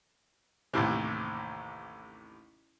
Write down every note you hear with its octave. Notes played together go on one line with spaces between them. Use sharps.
A1 D#2 A2 C3